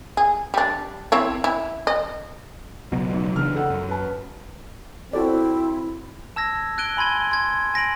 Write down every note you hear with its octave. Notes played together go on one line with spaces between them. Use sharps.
G#4
G3 D4
C4 E4 C#5
E4
D#5
C#2 B2 F#3
B1
C#3 E3 D4 F6
A4 F#5
F#2
B4 A5
C4 E4 F#4 A4 D5
A5 E6 G#6 A#6
F#6 G#6 D7 D#7 G7
G#5 B5 C6 G#6 D#7
C6 G#6
G#5 A#6 D7 F#7